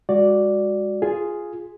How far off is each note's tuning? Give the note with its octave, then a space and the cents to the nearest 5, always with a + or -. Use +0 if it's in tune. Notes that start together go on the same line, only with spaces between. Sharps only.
G#3 -25 F#4 +0 D5 +0
F4 +0 G#4 +0